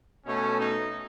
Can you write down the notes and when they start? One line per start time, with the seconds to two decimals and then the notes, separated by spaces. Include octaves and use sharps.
0.26 B2 A3 C#4
0.60 D#4